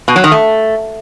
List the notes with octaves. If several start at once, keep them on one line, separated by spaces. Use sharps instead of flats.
B2
F#3
D#3
A3